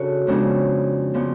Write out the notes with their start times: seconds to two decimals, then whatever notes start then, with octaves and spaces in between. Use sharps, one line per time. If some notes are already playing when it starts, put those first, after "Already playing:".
Already playing: C#3 D4 F#4 A4
0.27 F2 C#3 G#3 B3 D4
1.14 C#3 F3 B3 D4